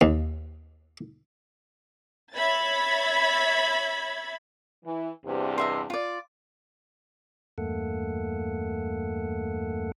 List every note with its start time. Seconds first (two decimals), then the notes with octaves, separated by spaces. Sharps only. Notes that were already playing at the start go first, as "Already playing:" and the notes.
0.01 D#2
2.34 C#5 E5 B5 G#6 A6
4.85 E3
5.26 E2 G2 C3
5.58 D#5 E5 C6
5.90 F4 D5
7.58 E2 G2 A3 A#3 A4 F#5